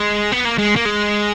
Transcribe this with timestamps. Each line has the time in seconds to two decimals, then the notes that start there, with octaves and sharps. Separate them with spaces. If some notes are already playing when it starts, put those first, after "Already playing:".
Already playing: G#3
0.32 B3
0.45 A#3
0.58 G#3
0.76 A#3
0.86 G#3